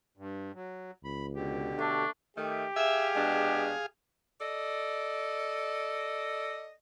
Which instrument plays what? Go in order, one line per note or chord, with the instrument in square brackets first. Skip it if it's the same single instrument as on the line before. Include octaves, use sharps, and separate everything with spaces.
[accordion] G2
F#3
[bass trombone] C#2 [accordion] B5
[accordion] B2 D3 G4
[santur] A3 [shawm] D4
[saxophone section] D#3 A3 [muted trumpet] G4
[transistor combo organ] G#4 F5 [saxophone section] E5
[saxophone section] B2 G#3 D4
A4 D5 D#5